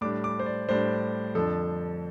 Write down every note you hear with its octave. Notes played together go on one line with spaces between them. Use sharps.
A2 G3 D4 D6
D6
C5
D5
A2 G3 D4 C5
F2 D3 F3 D4 A4